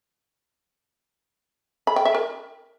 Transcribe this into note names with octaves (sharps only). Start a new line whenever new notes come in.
B5
G5
E5
A#4